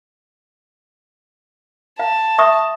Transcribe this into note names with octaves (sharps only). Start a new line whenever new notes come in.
F5 A5
E5 C#6 D#6